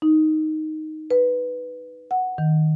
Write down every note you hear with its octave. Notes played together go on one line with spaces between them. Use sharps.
D#4
B4
F#5
D#3